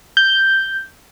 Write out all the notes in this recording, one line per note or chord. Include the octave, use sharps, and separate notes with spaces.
G6